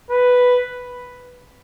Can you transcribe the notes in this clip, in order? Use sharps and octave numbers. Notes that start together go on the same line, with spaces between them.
B4